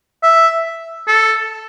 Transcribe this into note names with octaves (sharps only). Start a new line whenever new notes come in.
E5
A4